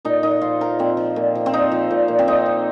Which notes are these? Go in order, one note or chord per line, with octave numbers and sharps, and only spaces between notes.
A#2 D#4
A#2 D#4
F3 F4
F3 A#4
A#2 C4
F3
A#2
F3
C4
A#2 D#4
F3
A#2
A#2
C4
A#2 D#4
F3